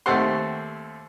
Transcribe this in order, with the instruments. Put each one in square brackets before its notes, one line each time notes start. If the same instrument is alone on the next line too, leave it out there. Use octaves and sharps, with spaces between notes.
[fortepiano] D#2 A3 C4 G4 F#5 C6